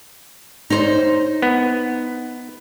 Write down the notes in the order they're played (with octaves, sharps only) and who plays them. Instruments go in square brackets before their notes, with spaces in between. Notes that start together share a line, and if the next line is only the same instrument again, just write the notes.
[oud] D#4 C5
[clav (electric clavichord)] B3